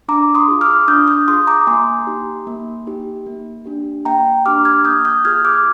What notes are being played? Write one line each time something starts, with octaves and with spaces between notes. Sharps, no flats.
D4 A#5 D6
C6 D#6
F4 G#4
D6 F6
D4 D#6 G6
D#6 G6
F4 G#4 C6 D#6
A#5 D6
A#3 G#5 C6
D#4 G4
A#3
D#4 G4
A#3
D4 G4
A#3 G5 A#5
D4 G4 D6 F6
F6 G#6
A#3 D#6 G6
D#6 G6
F4 G#4 F6 G#6
D6 F6